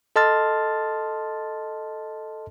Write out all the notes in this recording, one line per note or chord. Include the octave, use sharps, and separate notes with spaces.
A4 D#5 A5 C6 F6 A6